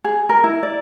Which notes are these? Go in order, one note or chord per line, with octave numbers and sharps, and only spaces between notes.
G#4
A#4
E4
D5